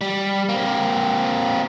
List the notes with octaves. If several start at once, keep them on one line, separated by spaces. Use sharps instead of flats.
G3
A#3 C4